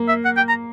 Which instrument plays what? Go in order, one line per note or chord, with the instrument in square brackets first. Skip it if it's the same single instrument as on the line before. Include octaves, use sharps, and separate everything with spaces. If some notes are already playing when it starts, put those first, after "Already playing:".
Already playing: [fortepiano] A#3
[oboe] E5
F#5
G5
A#5